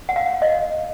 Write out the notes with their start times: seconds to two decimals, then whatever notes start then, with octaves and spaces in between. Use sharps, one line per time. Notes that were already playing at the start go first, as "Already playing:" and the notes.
0.09 F#5
0.16 F5
0.42 D#5